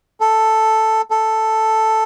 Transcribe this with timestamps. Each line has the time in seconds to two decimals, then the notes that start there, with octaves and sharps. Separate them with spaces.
0.20 A4
1.11 A4